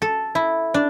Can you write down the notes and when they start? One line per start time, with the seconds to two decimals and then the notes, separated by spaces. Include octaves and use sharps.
0.02 A4
0.35 E4
0.74 D4